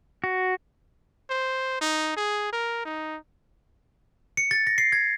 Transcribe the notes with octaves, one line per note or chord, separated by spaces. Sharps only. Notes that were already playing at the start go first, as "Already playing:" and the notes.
F#4
C5
D#4
G#4
A#4
D#4
C#7
A6
A#6
C7
G#6